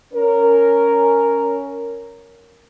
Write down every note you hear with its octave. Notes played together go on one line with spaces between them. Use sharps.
C#4 A#4